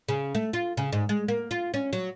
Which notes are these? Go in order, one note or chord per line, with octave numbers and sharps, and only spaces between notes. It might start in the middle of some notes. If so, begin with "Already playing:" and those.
C#3
A3
F4
C#3
G#2
G#3
A#3
F4
C#4
F#3